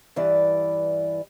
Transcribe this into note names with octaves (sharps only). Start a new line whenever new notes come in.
G2 E3 D5